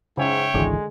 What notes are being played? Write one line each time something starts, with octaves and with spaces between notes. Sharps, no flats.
G#2 C#3 C#5 E5 G5
G#1 C#2 D3 E3 G#3